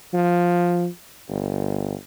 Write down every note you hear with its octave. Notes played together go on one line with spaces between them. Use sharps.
F3
G1